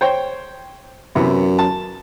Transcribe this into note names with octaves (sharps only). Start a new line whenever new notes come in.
C5 C#5 G5
F#2 C3 E3 B3
A5